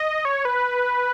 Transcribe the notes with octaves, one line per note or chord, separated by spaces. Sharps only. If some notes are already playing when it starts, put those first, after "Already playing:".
Already playing: D#5
C#5
B4